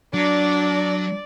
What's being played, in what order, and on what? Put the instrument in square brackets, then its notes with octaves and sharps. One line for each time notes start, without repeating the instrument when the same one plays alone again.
[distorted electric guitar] F#3 [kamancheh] D4 [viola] D5